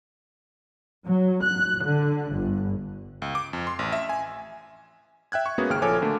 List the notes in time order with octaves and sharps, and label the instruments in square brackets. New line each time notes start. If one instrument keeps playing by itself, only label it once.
[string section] F#3
F#6
D3
G1
[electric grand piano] C#2
D6
F2
C6
A1
E5
G#5
E5 G5 F#6 G#6
C#6
G#3 A#3 B3 C#4 F#4 G#4
G#1 D#2 C#3 G5 F6 D7
A#1 F3 A4 C#5 G#5 D6
D3 A3 A#3